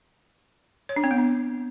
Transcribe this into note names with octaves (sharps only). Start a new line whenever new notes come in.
C#5
D4
C4
B3
D4